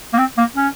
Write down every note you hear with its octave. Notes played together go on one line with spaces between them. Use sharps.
A#3
C4
A#3
C#4